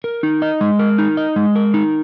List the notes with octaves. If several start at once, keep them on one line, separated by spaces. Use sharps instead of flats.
A#4
D#4
D#5
G#3
A#4
D#4
D#5
G#3
A#4
D#4